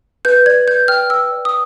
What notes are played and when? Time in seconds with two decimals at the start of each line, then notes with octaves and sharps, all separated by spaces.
0.25 B4 G6
0.46 D5 G#6
0.67 B4 G6
0.88 G5 F6
1.09 B4 E6
1.31 D5
1.45 D#6